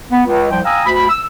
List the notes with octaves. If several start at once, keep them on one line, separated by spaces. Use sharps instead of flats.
B3
C#2
C2 F3 G5
F5 G5 G#5 A#5 D#6 E6
D2 B5
E6